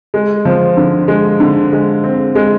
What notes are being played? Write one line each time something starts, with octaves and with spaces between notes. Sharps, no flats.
G#3
F3
D3
G#3
D3
G#3
C4
G#3